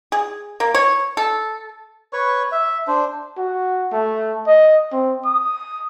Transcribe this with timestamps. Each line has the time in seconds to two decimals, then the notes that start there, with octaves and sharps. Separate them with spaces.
0.12 G#4
0.60 A#3
0.75 C#5
1.17 A4
2.13 B4 C#5 C#6
2.52 E5
2.87 D4 C5
3.38 F#4
3.93 A3
4.47 D#5
4.92 C4
5.25 D#6